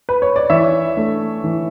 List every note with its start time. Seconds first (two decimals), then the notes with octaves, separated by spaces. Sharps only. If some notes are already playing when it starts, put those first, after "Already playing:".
0.09 B4
0.22 C#5
0.36 D5
0.50 E3 C#5 E5
0.97 A3 D4
1.44 E3